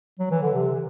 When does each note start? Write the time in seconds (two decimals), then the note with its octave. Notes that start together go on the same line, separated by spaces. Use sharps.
0.20 F#3
0.31 E3
0.42 D3
0.54 C3